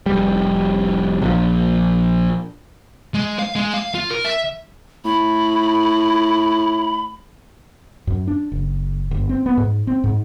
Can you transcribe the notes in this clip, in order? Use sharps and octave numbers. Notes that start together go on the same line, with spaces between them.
F1 G3
A#1 F3
G#3
F5
G#3
F5
F4
A#4
E5
A2 B5
F#2
D4
F#1
G1
C4
B3
G#2
C4
G#2